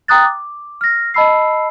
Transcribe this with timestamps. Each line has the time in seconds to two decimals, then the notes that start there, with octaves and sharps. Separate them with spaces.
0.08 G5 A#5 D#6 F#6 A6
0.25 D6
0.81 F6 A#6
1.14 D#5 A5 B5 E6 C7